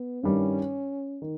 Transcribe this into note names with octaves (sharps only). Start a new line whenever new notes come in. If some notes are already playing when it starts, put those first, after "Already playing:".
Already playing: B3
G2 D#3 G3 C#4
D#3